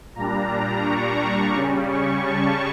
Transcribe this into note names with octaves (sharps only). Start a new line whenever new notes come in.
A#2 G3 D4 A#5
C#6
C#3 G3 C#4
C#6
A5